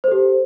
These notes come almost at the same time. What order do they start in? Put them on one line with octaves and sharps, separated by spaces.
C5 A4 G4